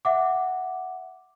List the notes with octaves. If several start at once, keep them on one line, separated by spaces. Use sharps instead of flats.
E5 F#5 D6